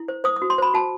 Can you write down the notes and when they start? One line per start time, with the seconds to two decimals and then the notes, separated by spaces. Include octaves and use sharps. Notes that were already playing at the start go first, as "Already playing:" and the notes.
Already playing: E4
0.08 C5
0.24 C5 D#6
0.36 D#6
0.42 F#4
0.50 C6
0.58 C5 B5
0.74 F#4 A5